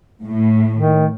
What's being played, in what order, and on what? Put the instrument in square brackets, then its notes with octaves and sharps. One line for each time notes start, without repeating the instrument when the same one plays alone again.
[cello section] A2
[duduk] D#3